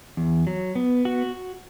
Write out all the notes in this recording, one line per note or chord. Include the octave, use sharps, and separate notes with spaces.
E2
F#3
B3
F#4